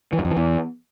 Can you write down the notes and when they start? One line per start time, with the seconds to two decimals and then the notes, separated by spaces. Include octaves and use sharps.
0.13 E3
0.19 F#2
0.25 F2
0.31 E3
0.37 E2